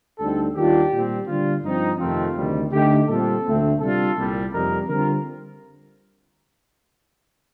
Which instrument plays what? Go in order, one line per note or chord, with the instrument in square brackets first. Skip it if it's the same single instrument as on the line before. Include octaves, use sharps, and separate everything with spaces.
[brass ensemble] D2 D3 G3 C4 D#4 A4
D#2 D#3 G3 D4 F4 G4
A#2 G3 C4
D3 G3 D4 F4
G2 F3 C4 D#4
F2 C3 D#3 A3 C4 F4
D2 C3 D#3 G3
D3 A3 D#4 G4
A#2 G3 C4 F4 A4
D2 D3 A3 C4
C3 G3 D4 F4 A4
C2 A#2 G3
F2 C3 G3 A#3 D#4 A#4
D3 G3 C4 F4 A#4